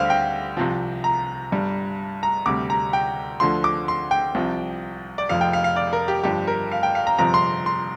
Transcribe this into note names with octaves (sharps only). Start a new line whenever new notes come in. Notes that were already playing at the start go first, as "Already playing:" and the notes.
Already playing: D2 D3 G3 G4 C5 F5
G5
C2 C3 F3
A#5
G1 G2 G3
A#5
D2 C3 G3 D6
A#5
G5
D2 D3 F3 C6
D6
C6
G5
C2 C3 F3
D5
F1 F2 F3 F5
G5
F5
F5
D5
A#4
G4
G1 G2 F3 G4
A#4
F5
G5
F5
A#5
G1 F2 C3 F3 A#5
C6
C6